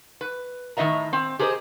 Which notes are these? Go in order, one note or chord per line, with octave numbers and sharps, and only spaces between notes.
B4
A2 D#3 D#4 D#5 E5 A#5
C4
G4 G#4 A#4 C5 D#5